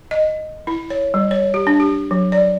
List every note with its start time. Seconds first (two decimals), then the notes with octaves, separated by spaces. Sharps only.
0.11 D#5
0.67 E4
0.90 C#5
1.14 G3
1.31 C#5
1.54 G4
1.67 D4
1.80 G4
2.11 F#3
2.32 D5